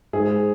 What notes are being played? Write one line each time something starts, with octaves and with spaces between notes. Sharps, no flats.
G#2 G#4